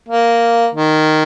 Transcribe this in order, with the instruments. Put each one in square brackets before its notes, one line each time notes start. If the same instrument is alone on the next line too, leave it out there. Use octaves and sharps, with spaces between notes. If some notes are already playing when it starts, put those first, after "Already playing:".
[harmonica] A#3
D#3